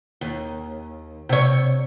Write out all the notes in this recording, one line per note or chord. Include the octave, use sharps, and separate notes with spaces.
D#2
C3 C#5